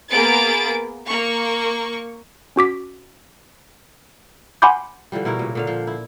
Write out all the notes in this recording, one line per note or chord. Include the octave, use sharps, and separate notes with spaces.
A#3 B3 G#4 A6 D7
A#3 C#6
C#4 F#4 D6 B6
F#5 G#5 B5 C6 D6 G6
D3 E3 F3 G3
B2 E4 A#4 C#5
A#2 C#3
A#2 D3 F5
F3
E4